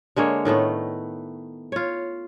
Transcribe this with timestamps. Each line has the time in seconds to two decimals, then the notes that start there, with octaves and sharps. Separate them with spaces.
0.16 D3 G#3 A#3 C#5
0.45 A2 D#3 A3 B3
1.72 F4 C#5